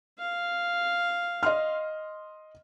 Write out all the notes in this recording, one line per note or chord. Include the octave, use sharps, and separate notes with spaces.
F5
D#5 C6 F6